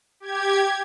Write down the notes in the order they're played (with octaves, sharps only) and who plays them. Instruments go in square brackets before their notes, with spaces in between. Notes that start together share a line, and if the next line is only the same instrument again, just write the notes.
[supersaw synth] G4 G#6